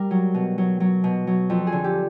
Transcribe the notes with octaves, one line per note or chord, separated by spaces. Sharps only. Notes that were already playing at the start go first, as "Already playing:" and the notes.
Already playing: G3 A#4
F#3
B2
F#3
F#3
B2
F#3
F2
G#4
D3
G4